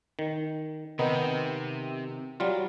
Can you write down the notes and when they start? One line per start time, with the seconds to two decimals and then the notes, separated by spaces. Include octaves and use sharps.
0.19 D#3
0.99 C3 D#3 B3 D#4
2.40 F#3 G3 F4